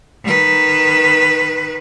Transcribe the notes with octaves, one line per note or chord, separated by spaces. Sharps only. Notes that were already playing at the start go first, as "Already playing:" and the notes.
D#3 B4